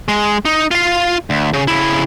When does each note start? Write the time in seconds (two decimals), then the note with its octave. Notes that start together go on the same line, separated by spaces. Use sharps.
0.08 G#3
0.45 D#4
0.71 F4 F5
1.30 D2
1.53 C#3
1.68 C#3 E4